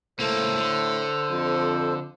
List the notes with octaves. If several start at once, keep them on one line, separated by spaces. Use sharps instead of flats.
C#2 A2 A#3 A4 C5
D3
F2